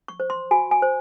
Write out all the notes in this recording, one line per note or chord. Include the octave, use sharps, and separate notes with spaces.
C#6
C5
C6
F#4 G#5
G#5
C5